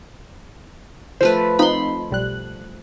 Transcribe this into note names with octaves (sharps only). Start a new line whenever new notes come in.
F3 A3 B4 C5
C4 D#4 F4 B5 C6
B1 G3 F#6